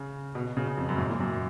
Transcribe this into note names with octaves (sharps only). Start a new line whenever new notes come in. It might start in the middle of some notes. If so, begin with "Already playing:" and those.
Already playing: C#3
B2
B2
C#3
C#3
F2
F#2
G#2
A#2
F#2